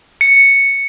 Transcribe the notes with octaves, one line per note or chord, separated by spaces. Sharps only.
C#7